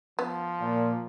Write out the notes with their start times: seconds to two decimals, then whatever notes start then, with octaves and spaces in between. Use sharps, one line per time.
0.19 F3 B3
0.61 A#2